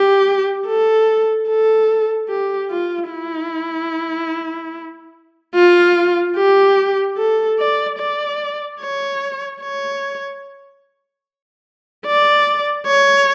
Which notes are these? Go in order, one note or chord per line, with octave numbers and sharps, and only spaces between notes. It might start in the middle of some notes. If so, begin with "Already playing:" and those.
Already playing: G4
A4
A4
G4
F4
E4
F4
G4
A4
D5
D5
C#5
C#5
D5
C#5